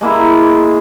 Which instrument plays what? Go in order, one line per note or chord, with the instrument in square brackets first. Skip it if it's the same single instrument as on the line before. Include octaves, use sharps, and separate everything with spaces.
[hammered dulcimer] G#3 A#3 E4